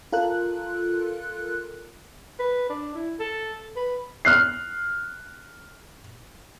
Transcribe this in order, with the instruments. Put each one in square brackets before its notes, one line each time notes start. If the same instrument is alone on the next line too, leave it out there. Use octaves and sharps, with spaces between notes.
[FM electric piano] F4 A4 A#4 F#6
[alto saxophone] B4
D4
E4
A4
B4
[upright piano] F6 F#6 C7